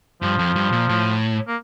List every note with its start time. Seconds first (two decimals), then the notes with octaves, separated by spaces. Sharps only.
0.22 G2 F3
0.39 F2
0.56 G2
0.72 A#2
0.89 A2
1.48 A#3